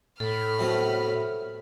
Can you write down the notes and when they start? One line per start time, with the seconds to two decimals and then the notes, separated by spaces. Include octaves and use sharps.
0.20 A2 A4 B5 F6
0.59 C3 F#3 B3